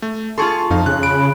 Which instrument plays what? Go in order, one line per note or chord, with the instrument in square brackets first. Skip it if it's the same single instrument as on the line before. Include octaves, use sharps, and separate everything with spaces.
[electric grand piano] A3
[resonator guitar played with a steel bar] F4 G#4 A4 [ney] A5 [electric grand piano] C6 C#6
[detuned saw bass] F2 [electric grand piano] D#4 F5
[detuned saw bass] C#3 [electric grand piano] F#6
[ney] B5 [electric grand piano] D7